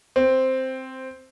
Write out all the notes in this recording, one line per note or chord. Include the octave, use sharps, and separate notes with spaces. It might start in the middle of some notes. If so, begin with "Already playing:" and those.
C4